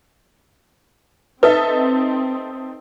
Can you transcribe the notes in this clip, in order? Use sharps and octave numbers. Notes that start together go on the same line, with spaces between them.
C4 D#4 A4 B4 E5